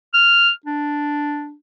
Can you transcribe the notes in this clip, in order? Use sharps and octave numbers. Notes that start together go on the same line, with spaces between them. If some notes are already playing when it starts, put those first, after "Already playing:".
F6
D4